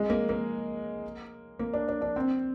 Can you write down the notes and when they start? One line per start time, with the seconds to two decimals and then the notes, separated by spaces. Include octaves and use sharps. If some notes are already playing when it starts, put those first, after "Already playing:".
Already playing: G#3
0.10 A#3
0.29 A#3
1.59 A#3
1.73 D4
1.88 D4
2.02 D4
2.16 C4